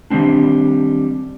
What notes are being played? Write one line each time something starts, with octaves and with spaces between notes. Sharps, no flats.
D#3 G3 A#3 C4 D4